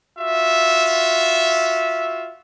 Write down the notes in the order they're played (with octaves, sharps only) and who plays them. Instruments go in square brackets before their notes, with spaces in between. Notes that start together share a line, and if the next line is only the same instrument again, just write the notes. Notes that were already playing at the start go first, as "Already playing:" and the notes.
[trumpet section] F4 F#4 E5